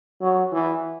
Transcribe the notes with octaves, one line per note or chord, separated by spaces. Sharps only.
F#3
E3